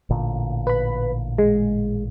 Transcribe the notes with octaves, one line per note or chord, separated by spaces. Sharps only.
A1 A#2 D3
B4 B5
G#3